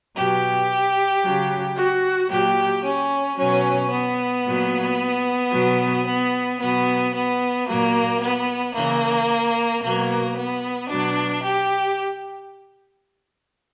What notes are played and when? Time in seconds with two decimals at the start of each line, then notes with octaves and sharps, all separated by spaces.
0.15 B2 F#3 G4
1.23 C#3 F#3
1.76 F#4
2.29 A#2 F#3 G4
2.83 C#4
3.36 B2 F#3 C#4
3.90 B3
4.44 A#2 F#3
5.51 B2 F#3
6.05 B3
6.60 B2 F#3 B3
7.13 B3
7.66 A#2 F#3 A#3
8.20 B3
8.74 C#3 E3 A#3
9.81 B2 F#3 A#3
10.36 B3
10.88 B2 F#3 D4
11.43 G4